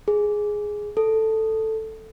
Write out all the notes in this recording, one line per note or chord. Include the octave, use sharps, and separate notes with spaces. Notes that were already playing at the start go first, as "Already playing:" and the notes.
G#4
A4